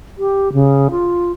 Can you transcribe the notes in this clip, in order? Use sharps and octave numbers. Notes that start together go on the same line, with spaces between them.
G4
C#3
F4